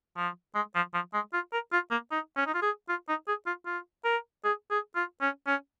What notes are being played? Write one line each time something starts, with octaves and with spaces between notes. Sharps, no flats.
F3
G#3
F3
F3
G#3
F4
A#4
F4
A#3
D#4
C#4
D#4
F4
G#4
F4
D#4
G#4
F4
F4
A#4
G#4
G#4
F4
C#4
C#4